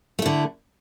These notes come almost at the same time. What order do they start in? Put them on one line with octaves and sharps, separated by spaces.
A3 E4 D3